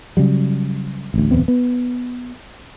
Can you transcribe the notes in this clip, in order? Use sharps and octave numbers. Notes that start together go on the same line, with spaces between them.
C#3 F#3 G3
A1 D2
D1 E2 B3 C4
B3